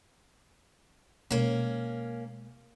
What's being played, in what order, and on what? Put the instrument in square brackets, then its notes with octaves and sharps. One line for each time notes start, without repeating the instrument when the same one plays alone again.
[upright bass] B2 G#3 [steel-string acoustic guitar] A#3 C#4